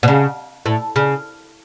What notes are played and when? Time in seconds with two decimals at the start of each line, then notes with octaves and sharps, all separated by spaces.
0.03 B2
0.08 C#3
0.66 A2
0.96 C#3